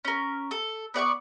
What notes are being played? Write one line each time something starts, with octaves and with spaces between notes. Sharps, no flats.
C#4 A#4
A4
B3 D5 F#5 C#6